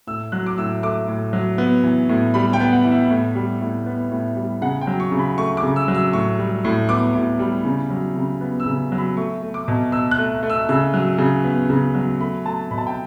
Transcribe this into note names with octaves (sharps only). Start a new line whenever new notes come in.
A2 E6
F#3 F#6
D6
A2 E6
A3 D6
A2
F#3
B3
E3
A2
G3 B5
G5
B3
F#5
E3
E5
A2
G3
A2
B3
A2
G3
C#3 F#5
G5
F#3
C#6
C#3
B5
A3 C#6
D6
C#3
E6
F#3
E6
A2 C#6
G3
A2
B3 D6
A2
G3
C#3
F#3
C#3
B3
E6
C#3
F#3
B5
A3 C#6
A3
D6
B2
B2 E6
F#6
A3
A3
E6
C#3 E6
F#3
C#3
B3
C#3
F#3
A3 B5
A3 A5
B2 B5
A5
G5